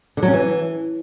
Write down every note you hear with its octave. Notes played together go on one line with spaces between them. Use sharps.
D3
F#3
C#4
E3